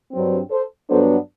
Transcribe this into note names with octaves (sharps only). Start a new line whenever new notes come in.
G2 F#3 C4
A4 C5
G2 F#3 B3 D4 A4 C5